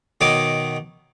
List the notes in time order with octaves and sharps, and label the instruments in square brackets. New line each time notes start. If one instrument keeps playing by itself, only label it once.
[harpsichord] B2 D#3 C#5 D#5 D6